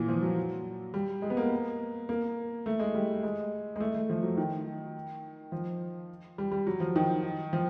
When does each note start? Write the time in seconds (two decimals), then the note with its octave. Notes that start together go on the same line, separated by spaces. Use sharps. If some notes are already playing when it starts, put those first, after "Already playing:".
Already playing: A#2 E3
0.08 F3
0.22 F#3
0.94 G3
1.22 G#3
1.30 B3
1.37 A#3
2.09 A#3
2.66 A3
2.80 G#3
2.95 G3
3.23 G#3
3.76 G#3
3.80 A3
3.94 A3
4.10 F3
4.23 F#3
4.37 D#3
5.52 F3
6.38 G3
6.52 G3
6.67 F#3
6.80 F3
6.96 D#3
7.53 F3